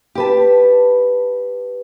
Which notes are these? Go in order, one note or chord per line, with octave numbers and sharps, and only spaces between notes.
G4 B4 A5